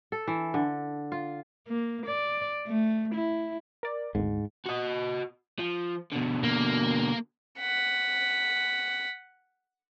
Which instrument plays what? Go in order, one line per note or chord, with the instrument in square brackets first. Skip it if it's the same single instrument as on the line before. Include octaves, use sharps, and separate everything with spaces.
[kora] A4
E3
D3
F4
[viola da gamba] A#3
D5
A3
E4
[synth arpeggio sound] A#4 D5
[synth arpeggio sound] G#1 D2 [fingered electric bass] G#2
[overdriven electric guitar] F#4 D#5
F3
B2 D3
[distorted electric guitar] A#3
[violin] F#5 B6